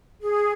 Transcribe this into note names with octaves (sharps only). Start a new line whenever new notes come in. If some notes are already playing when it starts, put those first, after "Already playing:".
G#4